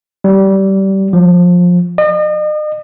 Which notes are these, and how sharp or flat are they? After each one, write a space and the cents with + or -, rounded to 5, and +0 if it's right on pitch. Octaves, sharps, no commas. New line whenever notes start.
G3 -20
F3 +20
D#5 -40